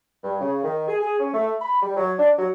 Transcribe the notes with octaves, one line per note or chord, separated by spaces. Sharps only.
G2
C#3
D#3
G#4
G#4
C#4
A3
B5
G3
F#3
D4
F#3